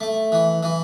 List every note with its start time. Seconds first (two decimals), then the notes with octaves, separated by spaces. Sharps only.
0.01 A3
0.32 E3
0.63 E3